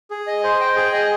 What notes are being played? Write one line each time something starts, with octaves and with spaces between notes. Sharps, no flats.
G#4
D#5
C5
G5
G#4
D#5